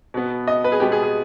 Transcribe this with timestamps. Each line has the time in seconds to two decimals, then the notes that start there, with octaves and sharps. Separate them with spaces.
0.14 B2 B3
0.48 D#5
0.64 B4
0.72 G#4
0.80 B2 G#3 B3 G4
0.92 G#4
1.03 G#4